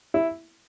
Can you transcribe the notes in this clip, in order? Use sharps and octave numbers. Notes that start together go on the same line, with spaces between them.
E4